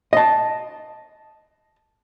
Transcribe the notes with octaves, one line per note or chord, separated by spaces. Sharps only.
D#5 A5